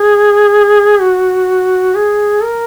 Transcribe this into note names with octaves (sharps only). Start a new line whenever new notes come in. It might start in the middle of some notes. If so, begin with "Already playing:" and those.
Already playing: G#4
F#4
G#4
A#4